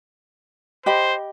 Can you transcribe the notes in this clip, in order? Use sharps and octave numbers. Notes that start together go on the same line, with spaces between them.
G4 C5 D#5 B5